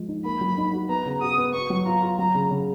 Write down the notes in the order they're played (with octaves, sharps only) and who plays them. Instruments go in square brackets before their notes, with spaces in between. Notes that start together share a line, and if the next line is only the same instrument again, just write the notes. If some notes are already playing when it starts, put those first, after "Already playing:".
Already playing: [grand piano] F3 G#3
D#4
[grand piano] A#3 [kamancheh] B5
[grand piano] F#3
D#4
F#4
[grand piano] B3 [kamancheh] A#5
[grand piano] C#3
[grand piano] F#4 [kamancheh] D#6
[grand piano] B3
[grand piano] B3 [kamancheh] C#6
[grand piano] F#3
[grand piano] F4 [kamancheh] A#5
[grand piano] F4
[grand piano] F#3 [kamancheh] A#5
[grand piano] C#3
C#3